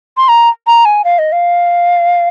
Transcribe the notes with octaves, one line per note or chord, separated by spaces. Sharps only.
C6
A#5
A#5
G#5
F5
D#5
F5